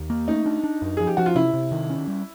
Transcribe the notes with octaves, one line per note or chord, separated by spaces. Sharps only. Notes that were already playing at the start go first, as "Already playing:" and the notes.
Already playing: D#2
A#3
A3 D#4
D4
D4
F#2
F3 G#4
G4
F3 F#4
F4
C3 E4
C3
D#3
C#4
G3